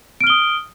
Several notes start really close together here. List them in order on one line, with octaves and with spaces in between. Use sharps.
D7 F6 G7 D#6